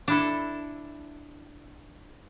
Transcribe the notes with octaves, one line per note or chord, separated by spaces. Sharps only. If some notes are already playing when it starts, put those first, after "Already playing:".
D4 E4 A4